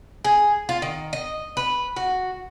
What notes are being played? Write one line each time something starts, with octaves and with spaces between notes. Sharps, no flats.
G#4
F4
D#3
D#5
B4
F#4